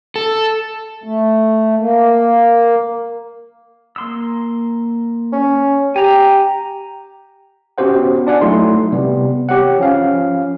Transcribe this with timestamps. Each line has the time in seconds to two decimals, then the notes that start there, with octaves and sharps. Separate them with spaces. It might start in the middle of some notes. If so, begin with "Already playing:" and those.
0.16 A4
1.04 A3
1.78 A#3
3.96 A#3 C6 E6
5.33 C#4
5.96 G4 G#5 A#5
7.78 B3 C#4 F#4 G4 C5 F#5
8.27 D4 D5 F#5 G#5
8.41 F#3 A3 D#4 E4 C6
8.92 C3 G3 B3
9.49 G4 C#5 F#5
9.79 F3 C#4 F5